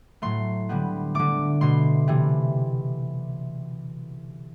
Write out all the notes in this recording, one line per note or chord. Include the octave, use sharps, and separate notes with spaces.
A2 F#3 A3 C6
D3 G3 B3
D3 A3 D6
B2 A3 C6
C3 E3 A3